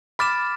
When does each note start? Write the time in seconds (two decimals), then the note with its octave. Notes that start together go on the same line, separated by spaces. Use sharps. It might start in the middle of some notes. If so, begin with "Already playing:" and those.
0.19 B5 D6 F6 A6 E7